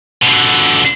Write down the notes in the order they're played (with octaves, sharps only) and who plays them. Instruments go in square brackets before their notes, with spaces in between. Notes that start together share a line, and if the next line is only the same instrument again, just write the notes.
[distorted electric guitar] B2 D3